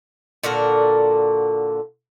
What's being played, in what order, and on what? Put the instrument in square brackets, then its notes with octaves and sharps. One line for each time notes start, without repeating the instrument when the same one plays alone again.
[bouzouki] A#2 D3 F#4 A#4